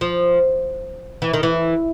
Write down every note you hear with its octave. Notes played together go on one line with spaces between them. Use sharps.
F3
E3
D#3
E3